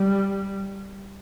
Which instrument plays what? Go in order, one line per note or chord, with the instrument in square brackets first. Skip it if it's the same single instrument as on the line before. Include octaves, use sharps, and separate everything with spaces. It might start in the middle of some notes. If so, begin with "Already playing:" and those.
Already playing: [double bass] G3